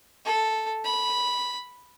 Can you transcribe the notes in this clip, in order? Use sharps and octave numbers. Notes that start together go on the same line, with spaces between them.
A4
B5